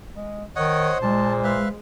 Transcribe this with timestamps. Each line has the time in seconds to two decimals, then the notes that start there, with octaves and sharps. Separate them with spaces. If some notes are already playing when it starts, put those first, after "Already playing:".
0.16 G#3
0.56 D#3 C5 C#5 D#5 F#5
1.02 A#2 G#3 A5
1.44 B4 E5 F5